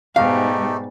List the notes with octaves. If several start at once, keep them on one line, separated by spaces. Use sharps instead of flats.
G#2 B2 G3 A3 D#4 G4 F5